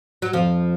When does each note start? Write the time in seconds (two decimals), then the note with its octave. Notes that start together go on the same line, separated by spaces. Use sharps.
0.22 F#3
0.33 F2 F3